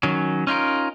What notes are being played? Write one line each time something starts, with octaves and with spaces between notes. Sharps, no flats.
D#3 F#3 C#4
C#4 D#4 F4 A#4